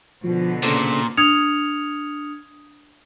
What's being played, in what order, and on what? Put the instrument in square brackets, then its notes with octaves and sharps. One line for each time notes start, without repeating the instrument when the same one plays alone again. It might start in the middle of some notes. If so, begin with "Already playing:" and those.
[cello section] B2 D3 [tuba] F3
[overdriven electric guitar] A#2 [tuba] C#3 [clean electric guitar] D4 A4 C5
[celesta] D4 D#6 F6 G#6 C#7 F7